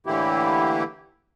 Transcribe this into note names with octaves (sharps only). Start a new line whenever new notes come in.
A2 D3 E3 A#3 E4 G4